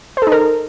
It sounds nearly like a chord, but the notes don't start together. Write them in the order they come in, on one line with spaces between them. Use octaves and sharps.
C5 A4 D#4 A#4